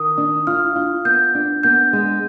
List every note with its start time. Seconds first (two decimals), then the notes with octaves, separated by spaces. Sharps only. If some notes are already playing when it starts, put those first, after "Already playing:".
Already playing: D#3 D#6
0.18 D4
0.47 F4 F6
0.76 F4
1.05 B3 G6
1.35 D4
1.63 B3 G6
1.93 G#3